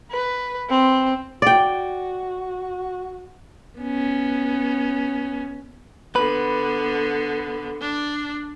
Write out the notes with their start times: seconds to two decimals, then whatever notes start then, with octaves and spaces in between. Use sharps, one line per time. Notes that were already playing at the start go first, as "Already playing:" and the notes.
0.11 B4
0.69 C4
1.42 F#4 D5 G5
3.79 B3 C#4
6.16 D3 B3 B4
7.81 D4